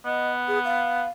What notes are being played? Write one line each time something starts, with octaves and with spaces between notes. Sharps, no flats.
B3 D#5
G#4
F5